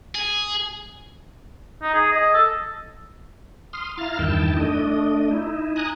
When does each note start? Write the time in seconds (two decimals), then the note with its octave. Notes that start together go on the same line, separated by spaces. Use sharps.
0.15 G#4
1.82 D#4
1.94 G#4
2.11 D#5
2.34 A4
3.73 C6 D#6 F6
3.97 E4 F5 A#5 F6 A6
4.19 E2 G2 D#3 E4 G5 A5
4.57 A3 D4 D#5
5.31 D#4 E4
5.76 G#5 A#5 D#6 F#6